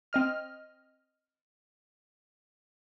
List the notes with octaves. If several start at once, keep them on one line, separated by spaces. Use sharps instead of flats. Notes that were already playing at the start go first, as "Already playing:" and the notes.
C4 D#5 F6